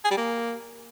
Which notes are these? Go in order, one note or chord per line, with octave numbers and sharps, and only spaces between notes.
G#4
G3
A#3